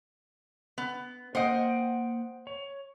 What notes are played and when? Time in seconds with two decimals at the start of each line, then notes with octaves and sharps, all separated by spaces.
0.78 B3
1.35 A#3 C5 D#5 F#5 G5
2.47 C#5